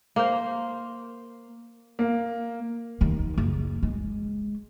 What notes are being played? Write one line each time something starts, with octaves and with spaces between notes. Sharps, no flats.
A#3 C5
A#3
D#2 D#3
F#1
G#3